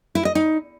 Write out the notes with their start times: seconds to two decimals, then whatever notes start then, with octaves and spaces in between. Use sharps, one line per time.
0.15 E4
0.25 D#5
0.35 D#4